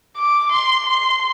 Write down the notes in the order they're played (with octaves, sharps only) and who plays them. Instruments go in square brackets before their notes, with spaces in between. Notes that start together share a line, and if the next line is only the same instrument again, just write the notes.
[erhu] D6
C6
C6